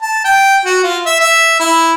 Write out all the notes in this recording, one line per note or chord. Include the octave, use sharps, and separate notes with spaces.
A5
G5
F#4
F4
E5
E5
E4